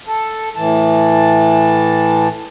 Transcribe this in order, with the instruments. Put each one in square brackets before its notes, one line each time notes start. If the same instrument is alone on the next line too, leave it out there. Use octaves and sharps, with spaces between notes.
[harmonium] A4
A2 E3 A5